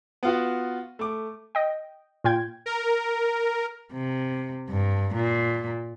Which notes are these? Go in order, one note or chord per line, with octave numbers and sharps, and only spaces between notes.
B3 F4 F#4
A3 D6
D#5 G5
A#2 F4 G5 G#6
A#4
C3
G2
A#2